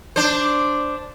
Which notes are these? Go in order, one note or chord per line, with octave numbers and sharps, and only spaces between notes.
D4 C5